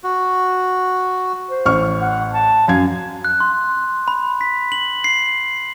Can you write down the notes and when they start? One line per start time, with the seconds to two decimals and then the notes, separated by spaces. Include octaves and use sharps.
0.04 F#4
1.50 C5
1.65 A1 C#6 F6
2.01 F#5
2.32 A5
2.68 F#2 F5 G#6
3.25 F#6
3.40 C6
4.08 B5
4.41 B6
4.72 F#7
5.04 C7